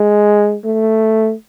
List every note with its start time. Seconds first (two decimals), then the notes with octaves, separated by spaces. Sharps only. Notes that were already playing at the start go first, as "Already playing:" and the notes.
Already playing: G#3
0.65 A3